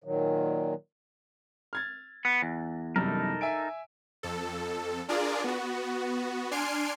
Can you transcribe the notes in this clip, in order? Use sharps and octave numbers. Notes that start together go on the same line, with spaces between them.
A#2 D#3 F#3
F6 G#6 A6
B3 F#6
E2
F#2 C3 G3 D#4 A4 A#4
E5 G#5 D7
F2 A4
D4 F4 G#4 A#4 D5
B3 F#4
D4 G#5 C6 F6 C7 D7